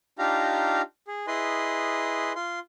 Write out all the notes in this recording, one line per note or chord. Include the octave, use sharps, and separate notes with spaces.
D4 D#4 F4 G4 F5 A#5
G#4
E4 G#4 B4 D#5 C6
F4 C6